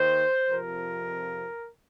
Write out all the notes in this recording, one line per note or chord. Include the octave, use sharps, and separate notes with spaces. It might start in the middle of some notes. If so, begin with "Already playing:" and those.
Already playing: D#2 D#3 C5
F2 C3 F3 A#4